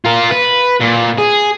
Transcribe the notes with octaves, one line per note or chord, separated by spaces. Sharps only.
F4 A#4
B4
A#2
G#4